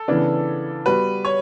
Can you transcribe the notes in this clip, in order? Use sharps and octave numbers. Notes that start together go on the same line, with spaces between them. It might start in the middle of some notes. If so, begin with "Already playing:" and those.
Already playing: A4
C#3 E3 B3 D4
G3 B3 F#4 B4
C#5